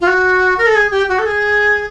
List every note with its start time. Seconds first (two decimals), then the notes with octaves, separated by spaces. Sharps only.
0.01 F4
0.07 F#4
0.58 A#4
0.67 A4
0.76 G#4
0.91 G4
1.09 F#4
1.19 A4
1.26 G#4